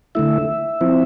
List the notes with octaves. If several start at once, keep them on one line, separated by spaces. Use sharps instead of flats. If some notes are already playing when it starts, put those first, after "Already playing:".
D3 A3 E4 E5
F3 C4 E4